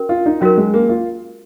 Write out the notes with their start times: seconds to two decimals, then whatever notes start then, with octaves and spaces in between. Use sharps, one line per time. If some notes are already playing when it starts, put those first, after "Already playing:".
Already playing: C#4 F#4 A#4
0.09 F4
0.26 D#4
0.41 F#3 C#4 F#4 A#4
0.58 G#3
0.74 A#3
0.89 F4